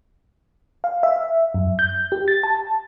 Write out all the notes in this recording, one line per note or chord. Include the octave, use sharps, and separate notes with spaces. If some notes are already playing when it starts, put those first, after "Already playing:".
F5
E5
F#2
G6
G4
A6
A5